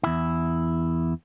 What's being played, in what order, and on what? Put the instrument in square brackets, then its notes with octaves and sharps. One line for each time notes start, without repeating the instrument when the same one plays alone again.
[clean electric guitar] E2 E4